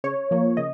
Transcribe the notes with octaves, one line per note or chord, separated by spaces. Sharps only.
C#3 C#5
F3 A#3
C#3 D#5